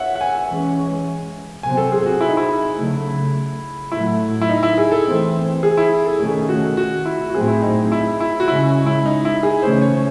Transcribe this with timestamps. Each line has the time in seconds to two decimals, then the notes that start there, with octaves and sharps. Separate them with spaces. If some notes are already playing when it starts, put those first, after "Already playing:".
Already playing: C#5 E5 F#5
0.15 F#5
0.21 G#5
0.50 E3 G#3 C#4
1.63 C3 F#3 C4 G#5
1.77 A4
1.92 G#4
2.06 F#4
2.21 E4
2.29 D#4
2.37 E4
2.77 C#3 F#3 A3
3.92 A2 F#3 A3 E4
4.42 E4
4.49 D#4
4.63 E4
4.78 G#4
4.92 A4
5.05 E3 A3 C4
5.63 G#4
5.77 E4
6.06 A4
6.20 C3 D#3 A3 C#4 G#4
6.49 F#4
6.77 F#4
7.05 E4
7.30 F#4
7.34 A2 F#3 A3 C4 G#4
7.48 E4
7.62 D#4
7.92 E4
8.20 E4
8.40 F#4
8.48 C#3 G#3 C#4 E4
8.86 E4
9.06 D#4
9.25 E4
9.43 G#4
9.62 C#3 E3 A3 C#4 C5
9.81 C#5